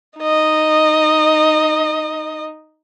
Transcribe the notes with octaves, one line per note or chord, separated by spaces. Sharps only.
D#4 D#5